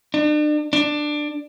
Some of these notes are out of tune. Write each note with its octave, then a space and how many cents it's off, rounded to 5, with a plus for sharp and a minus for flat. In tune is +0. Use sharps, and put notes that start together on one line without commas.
D4 +40
D4 +15